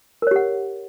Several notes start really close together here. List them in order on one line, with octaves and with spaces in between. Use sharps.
A#4 C#5 G4 F#5